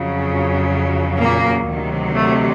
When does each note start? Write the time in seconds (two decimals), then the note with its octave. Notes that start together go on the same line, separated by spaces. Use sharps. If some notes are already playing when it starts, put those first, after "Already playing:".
Already playing: F2 C#3 F#3
1.18 A#2 A#3
1.67 D2 C3 D#3 F#3
2.16 A3